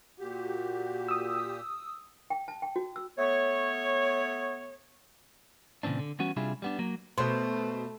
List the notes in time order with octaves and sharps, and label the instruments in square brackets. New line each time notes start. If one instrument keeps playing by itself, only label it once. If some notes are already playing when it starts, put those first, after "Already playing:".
[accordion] A#2 G4 [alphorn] F#4
[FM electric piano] D#6 E6
[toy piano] G5
A5
G5
F#4
E6
[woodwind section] A3 B3 C#5
[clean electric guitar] A#2 C#3 E3 C4 D4
D3
E3 G3 B3 C#4 F#4
C3 G3 D4 E4 F4 G#4
G3 B3 D4
F#3 A#3
[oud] B2 [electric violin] A3 [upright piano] B4 C5 C6